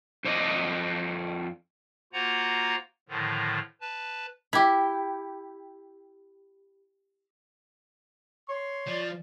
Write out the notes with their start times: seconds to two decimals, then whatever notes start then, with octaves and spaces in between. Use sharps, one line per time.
0.24 F2 C5 D5 D#5
2.13 A#3 F4 F#4 C5 F#5 A#5
3.09 A2 D3 D#3 F3
3.81 B4 A5
4.53 E4 G4
8.48 C#5 C6
8.87 F3 D5